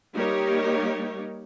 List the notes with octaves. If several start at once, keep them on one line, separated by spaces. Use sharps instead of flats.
G3 A#3 D#4 G4 A#4 C#5